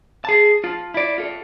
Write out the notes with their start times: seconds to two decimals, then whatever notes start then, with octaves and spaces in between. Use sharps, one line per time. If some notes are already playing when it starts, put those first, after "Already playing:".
0.25 G#4 A5
0.64 F4 A5
0.94 E4 D5
1.18 F4 A4